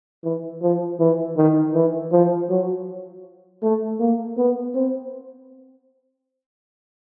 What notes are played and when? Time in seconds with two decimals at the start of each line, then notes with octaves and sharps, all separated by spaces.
0.24 E3
0.62 F3
0.99 E3
1.37 D#3
1.74 E3
2.12 F3
2.49 F#3
3.62 A3
4.00 A#3
4.37 B3
4.75 C4